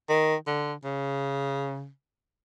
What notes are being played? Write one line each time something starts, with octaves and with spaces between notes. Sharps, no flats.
D#3
D3
C#3